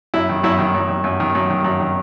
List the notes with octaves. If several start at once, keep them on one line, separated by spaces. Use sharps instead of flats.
F#2 E4
D#3
F#2 E4
D#3
F#2
D#3
F#2
D#3
F#2
D#3
F#2
D#3